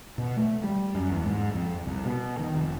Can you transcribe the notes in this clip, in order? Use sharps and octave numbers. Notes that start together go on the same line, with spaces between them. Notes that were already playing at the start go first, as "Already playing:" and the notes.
B2
A3
G3
F#2
E2
G#2
F2
C2
B2
D#3
F1